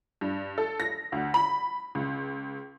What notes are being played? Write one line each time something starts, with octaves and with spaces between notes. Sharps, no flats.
G2
A4
A#6
D2
B5
C#2